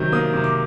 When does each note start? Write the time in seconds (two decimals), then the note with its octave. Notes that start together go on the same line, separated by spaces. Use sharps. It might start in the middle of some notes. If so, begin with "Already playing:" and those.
Already playing: C3 D#3 F#3 G6
0.12 A#3 D#6
0.34 C3
0.44 D6